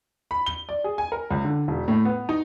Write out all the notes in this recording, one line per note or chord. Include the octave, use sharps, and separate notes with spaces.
B5
G7
D5
G#4
G#5
A#4
C#2
D3
E1
A2
B3
D#4